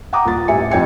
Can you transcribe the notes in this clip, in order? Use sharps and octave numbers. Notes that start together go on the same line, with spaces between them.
F#5 G5 A#5 D6 D#6
D#1 F4 A6
A1 G4 E5 G#5 C#7
F2 D#5 G5 G#6 C#7